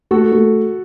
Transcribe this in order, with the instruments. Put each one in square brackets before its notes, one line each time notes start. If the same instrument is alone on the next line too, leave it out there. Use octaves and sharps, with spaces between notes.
[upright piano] A3 [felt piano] F#4 A4
[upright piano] A3